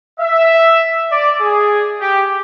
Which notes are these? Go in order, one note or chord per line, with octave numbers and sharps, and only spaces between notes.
E5
D5
G#4
G4